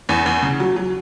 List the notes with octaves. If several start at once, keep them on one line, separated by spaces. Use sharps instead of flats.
E2
E2
C#3
F#3
F#3